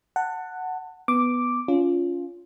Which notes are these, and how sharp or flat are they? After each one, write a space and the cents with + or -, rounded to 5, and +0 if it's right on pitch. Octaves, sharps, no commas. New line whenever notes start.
F#5 +0 A5 +25
B3 +0 D6 +0
C#4 +25 F4 +0